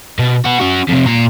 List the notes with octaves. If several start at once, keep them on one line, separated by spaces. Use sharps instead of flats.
B2
F#4 B4
C#4 F#4
F2 C3
A#2 A#5